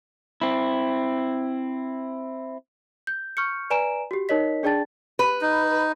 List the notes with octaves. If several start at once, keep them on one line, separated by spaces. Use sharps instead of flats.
C4 E4
G6
C#6 F6 G6 C#7
B4 D5 G#5 A#5 D7 E7
F#4 G4
D#4 A#4 C#5 D#5 B6
D4 G#4 D5 G5 A5 A6
B4
D#4